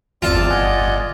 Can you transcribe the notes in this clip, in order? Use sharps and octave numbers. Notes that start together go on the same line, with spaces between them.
G1 E2 C4 F4 D5 A5
G1 D#5 F#5 G#5